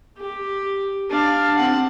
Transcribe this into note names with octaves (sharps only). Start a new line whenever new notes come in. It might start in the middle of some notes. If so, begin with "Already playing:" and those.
G4
D4 F5
C4 F#5